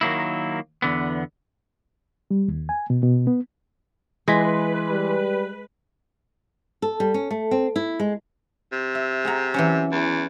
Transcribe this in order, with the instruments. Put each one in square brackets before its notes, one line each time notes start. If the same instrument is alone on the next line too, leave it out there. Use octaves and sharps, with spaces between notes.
[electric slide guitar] D#3 F#3 A#3 E4
E2 D3 B3
[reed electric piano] G3
D#2
G#5
B2
B2
B3
[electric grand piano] E3 C6 B6 [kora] G#3 [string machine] B4
[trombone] G3
[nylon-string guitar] A4
G3
C#4
A3
C4
E4
G#3
[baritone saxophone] C3
[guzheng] E5
G#4 F#5 A#5
E3 F#3 C#4
[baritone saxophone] E2